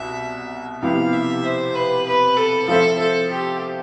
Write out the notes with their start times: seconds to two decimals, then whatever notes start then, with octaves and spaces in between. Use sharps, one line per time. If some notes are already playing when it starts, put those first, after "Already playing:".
Already playing: C2 B2 E5
0.82 C3 F3 B3 E4 G4 F5
1.13 E5
1.44 C5
1.75 B4
2.06 B4
2.37 A4
2.68 F3 C4 F4 A4 C5 E5
2.99 A4
3.31 G4